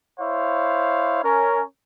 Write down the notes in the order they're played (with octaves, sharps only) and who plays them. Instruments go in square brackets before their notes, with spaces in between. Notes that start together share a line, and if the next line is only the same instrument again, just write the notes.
[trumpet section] E4 C5 C#5 F5
C#4 A#4